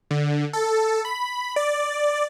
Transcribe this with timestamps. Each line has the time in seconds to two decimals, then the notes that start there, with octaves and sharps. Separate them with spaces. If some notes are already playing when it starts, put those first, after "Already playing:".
0.11 D3
0.53 A4
1.05 B5
1.56 D5